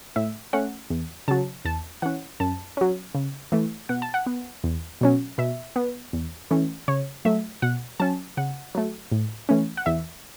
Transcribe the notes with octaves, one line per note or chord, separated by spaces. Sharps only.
A2 E5
A3 C#4 F#5
E2
C#3 F#3 A5
E2 A5
E3 C#4 F#5
F#2 A5
F#3 C#4
C#3
E3 A3
B2 F#5
A5
F#5
B3
E2
B2 F#3 C#4
B2 E5
B3
E2
E3 A3 C#4
C#3 C#5
F#3 A3 E5
B2 F#5
F#3 C#4 A5
C#3 F#5
F#3 A3
A2
E3 A3 C#4
F#5
E2 E5